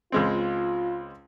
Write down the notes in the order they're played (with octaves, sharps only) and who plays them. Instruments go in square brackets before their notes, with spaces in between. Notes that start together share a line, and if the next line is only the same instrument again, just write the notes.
[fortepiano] C#2 G#3 C4 [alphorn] F4